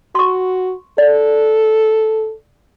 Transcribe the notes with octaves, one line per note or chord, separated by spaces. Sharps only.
F#4 C6 C#6
A4 D5